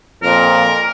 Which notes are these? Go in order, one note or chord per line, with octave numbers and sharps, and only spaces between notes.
F2 A#2 A#4